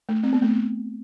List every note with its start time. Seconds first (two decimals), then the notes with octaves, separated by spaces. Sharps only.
0.09 A3
0.23 C4
0.33 B3
0.42 A3
0.51 B3